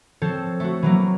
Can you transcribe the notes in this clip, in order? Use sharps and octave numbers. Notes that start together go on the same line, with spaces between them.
F3 C4 A4 C5 C#5
A3 F#4
E3 F#3 A#3